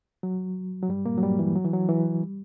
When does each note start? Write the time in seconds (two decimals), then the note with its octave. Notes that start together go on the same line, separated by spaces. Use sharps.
0.23 F#3
0.83 F#3
0.89 G2 G3
1.06 A#2 A#3
1.18 F#3
1.22 G2 G3
1.39 E3
1.56 F#3
1.65 E3
1.73 F#3
1.89 E3
2.23 G3